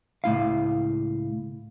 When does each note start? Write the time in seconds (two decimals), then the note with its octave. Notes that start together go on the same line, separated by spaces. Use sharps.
0.24 C#2 A2 E4 F5